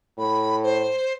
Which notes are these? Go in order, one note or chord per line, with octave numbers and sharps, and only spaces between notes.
A2 B5
C5